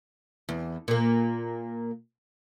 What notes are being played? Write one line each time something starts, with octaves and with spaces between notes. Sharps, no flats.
E2
A#2 A#3